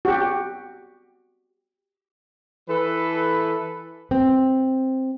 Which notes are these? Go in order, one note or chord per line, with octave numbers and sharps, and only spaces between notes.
F#4 G4
E3 A4 B4
C4